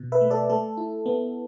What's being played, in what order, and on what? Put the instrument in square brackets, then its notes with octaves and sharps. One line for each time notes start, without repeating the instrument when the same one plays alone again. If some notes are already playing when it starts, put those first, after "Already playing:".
Already playing: [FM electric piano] B2
B4 E5
A3
A4 D5
A3 A4
E4
B3